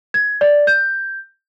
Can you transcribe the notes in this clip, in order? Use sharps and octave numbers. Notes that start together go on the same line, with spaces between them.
G#6
D5
G6